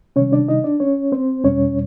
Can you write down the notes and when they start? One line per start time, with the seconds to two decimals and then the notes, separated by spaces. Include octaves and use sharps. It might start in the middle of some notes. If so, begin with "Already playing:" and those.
0.16 C3 D#3 G3 C#4 C#5
0.32 D4 D5
0.48 D#4 D#5
0.64 D4 D5
0.80 C#4 C#5
1.12 C4 C5
1.44 E2 B2 G3 C#4 C#5